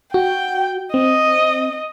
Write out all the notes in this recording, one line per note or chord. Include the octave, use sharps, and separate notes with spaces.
F#4 G5
C4 D#5